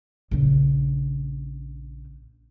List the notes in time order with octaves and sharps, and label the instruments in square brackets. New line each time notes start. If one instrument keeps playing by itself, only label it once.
[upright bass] A#1 C#3